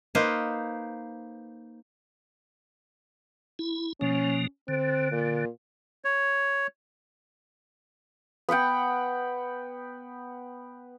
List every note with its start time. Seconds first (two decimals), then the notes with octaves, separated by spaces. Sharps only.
0.15 A#3 D#4 B4 C5
3.59 E4
4.01 B2 F3 A#3 C#4
4.68 D3 C4
5.12 A#2
6.04 C#5
8.49 B3 B4 F#5 G5